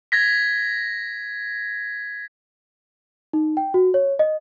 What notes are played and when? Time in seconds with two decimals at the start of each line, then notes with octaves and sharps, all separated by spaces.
0.12 G#6 A#6 B6
3.33 D#4
3.57 G5
3.74 F#4
3.94 C#5
4.19 D#5